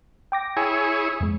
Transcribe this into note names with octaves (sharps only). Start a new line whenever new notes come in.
G5 D6 A#6
E4 G#4 C#5 G#5
F2 G#3